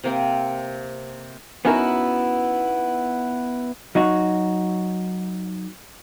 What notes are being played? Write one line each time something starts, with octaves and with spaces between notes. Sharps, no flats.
C3 A#3 C4
B3 C#4 D#4 E4 F#4 A#4
F#3 D#4 F#4